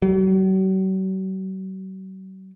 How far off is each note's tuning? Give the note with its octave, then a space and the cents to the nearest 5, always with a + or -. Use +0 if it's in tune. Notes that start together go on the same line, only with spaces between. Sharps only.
F#3 +45